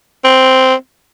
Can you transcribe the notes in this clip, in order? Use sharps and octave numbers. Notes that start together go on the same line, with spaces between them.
C4